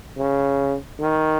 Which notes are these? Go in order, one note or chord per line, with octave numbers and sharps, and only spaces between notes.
C#3
D#3